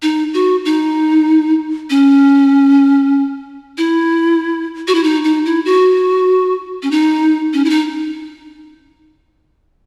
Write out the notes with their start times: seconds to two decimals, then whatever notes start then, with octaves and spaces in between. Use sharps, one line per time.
0.02 D#4
0.34 F#4
0.65 D#4
1.90 C#4
3.78 E4
4.88 F#4
4.95 E4
5.04 D#4
5.24 D#4
5.46 E4
5.65 F#4
6.83 C#4
6.91 D#4
7.53 C#4
7.65 E4
7.70 D#4